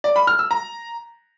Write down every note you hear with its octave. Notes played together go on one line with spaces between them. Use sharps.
D5
B5
F6
E6
A#5